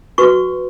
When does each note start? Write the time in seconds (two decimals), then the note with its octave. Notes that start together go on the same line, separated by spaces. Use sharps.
0.18 F#4 B4 C#6